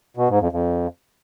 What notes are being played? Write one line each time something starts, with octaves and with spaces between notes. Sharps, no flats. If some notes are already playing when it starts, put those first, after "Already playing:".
B2
G#2
F2
F2